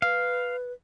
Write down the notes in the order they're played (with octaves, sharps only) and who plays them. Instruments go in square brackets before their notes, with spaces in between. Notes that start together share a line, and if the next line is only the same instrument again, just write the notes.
[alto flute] B4 [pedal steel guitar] F5